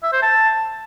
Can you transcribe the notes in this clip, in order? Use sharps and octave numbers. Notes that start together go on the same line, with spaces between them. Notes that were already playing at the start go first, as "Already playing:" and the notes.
E5
C5
A5